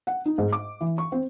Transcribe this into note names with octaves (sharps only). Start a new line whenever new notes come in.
F#5
D#4
G#2
D6
E3
C#6
C4